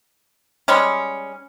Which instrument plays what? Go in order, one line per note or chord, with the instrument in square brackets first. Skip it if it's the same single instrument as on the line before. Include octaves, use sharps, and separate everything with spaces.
[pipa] G3 G#3 C#4